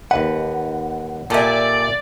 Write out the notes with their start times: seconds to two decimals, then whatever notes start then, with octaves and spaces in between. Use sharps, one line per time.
0.11 D#2 B4 F#5
1.30 A#2 G4 A4 D5 E5 G#5